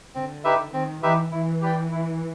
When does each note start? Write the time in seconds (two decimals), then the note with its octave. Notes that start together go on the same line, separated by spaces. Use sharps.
0.14 D3 C4
0.44 D#4 G4 B4 E5
0.73 D#3 C4
1.03 E3 D#4 G4 B4 E5
1.32 E3 E4
1.61 G4 B4 D5 G5
1.91 E4